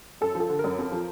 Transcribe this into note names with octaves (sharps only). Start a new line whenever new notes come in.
F#2 A4
F3
A4
D3
A#4
F#2
F2
F3